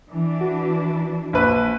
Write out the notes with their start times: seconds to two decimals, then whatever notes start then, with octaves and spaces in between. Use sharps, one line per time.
0.10 E3 D4
0.41 F#4
1.33 A#1 B4